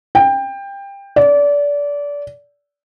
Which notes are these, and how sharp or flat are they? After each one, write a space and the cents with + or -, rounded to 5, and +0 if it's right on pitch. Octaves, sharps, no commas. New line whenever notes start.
G5 +20
D5 -25